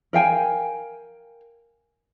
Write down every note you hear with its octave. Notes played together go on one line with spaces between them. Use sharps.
A#4 F5 G5 G#5